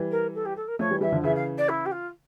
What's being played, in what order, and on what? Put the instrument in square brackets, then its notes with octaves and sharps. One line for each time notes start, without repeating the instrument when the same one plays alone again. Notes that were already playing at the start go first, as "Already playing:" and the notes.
Already playing: [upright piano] E3 G3
[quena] A#4
A4
G4
A4
A#4
[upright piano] F3 A3 [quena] C#5
[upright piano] E3 G3
[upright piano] E3 G3 [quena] E5
[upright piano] D3 F3
[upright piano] C#3 E3 [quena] E5
[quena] F5
D5
E4
G4
F4